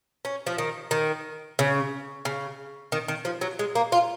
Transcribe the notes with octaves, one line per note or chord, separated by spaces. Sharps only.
C#4
F3
D#3
D#3
C#3
C#3
D#3
D#3
F3
F#3
G#3
A#3
F4